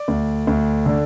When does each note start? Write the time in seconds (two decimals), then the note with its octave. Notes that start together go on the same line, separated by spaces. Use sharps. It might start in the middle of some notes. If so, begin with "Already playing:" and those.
Already playing: D5
0.08 D2
0.47 D2
0.86 D3